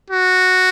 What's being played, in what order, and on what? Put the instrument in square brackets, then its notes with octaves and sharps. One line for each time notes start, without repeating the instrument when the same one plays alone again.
[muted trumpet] F#4